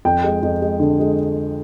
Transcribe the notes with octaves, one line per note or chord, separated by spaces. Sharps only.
F2 G5
G#3
F2
G#3
D3
G#3